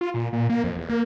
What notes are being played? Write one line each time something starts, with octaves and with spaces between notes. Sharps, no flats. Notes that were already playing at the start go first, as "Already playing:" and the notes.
F4
A#2
A#2
A#3
F2
E2
A#3